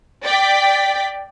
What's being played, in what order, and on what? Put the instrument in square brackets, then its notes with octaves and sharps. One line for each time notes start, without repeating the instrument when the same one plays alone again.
[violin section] D5 G5 B6